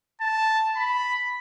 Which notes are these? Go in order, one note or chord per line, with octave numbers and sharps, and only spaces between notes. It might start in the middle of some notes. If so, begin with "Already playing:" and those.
A5
B5